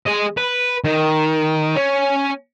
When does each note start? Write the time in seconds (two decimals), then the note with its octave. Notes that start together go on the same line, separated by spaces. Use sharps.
0.07 G#3 D#5
0.38 B4
0.84 D#3
1.76 C#4